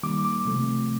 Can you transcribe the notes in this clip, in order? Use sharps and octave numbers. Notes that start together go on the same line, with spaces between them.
D#3 G3 A#3 D6
D6
C3 F3 A3 C4